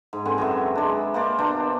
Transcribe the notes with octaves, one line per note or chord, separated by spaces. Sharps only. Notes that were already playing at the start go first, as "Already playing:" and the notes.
G#2
D3 C4 B4 G#5
F#2 F#3 E5
G#3 D4
A#3 C5 D5
B2 D4 C5 A#5